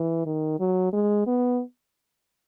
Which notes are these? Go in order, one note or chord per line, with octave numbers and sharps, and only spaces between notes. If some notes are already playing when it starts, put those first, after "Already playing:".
Already playing: E3
D#3
F#3
G#3
B3